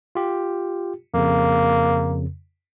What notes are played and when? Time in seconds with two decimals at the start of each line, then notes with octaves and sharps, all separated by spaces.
0.15 F4 G4
1.14 F2 C#3 A#3